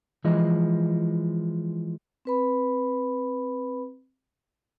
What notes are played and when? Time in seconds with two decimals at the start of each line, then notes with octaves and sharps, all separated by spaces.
0.24 E3 F3 G#3 E4 D#5
2.25 C4 B4 B5